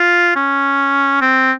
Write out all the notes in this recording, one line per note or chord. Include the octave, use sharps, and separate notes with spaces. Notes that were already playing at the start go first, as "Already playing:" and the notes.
Already playing: F4
C#4
C4